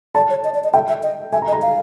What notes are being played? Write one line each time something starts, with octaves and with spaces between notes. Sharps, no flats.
D5 A5
C#5
D#5
D5
D#5
E5 G5
E5
D#5
E5 G#5
A#5
D#5
A#5
F5